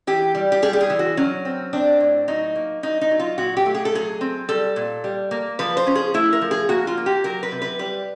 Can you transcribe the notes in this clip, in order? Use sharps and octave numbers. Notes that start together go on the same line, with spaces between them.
E3 G4
G3
G4
G3 G#4
G4
G#4
E3
F#4
F#3 C#4
C4
C4 D4
A2
F#3 D#4
A#3
F#3 D#4
D#4
F#3
F4
A#2 F#4
G4
A3
G#4
A4
F#3 G#4
C4
G3 A4
A#2
G3
A#3
F3 B4
C5
C#4
G#4
A3 E4
A#4
F3
G#4
A#3 F#4
F4
A#3
G4
F#3 A#4
B4
C3
B4
G3 B4